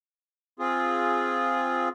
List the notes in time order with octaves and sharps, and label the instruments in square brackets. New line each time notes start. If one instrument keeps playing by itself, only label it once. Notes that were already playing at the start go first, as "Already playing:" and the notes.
[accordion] C4 F4 G#4